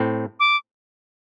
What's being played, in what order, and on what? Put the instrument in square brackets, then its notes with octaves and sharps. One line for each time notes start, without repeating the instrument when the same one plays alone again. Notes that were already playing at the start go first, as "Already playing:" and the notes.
Already playing: [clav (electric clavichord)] A2 C4
[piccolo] D6